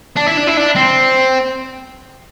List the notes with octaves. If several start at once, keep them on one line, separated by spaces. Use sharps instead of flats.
D4
E4
D4
E4
D4
C4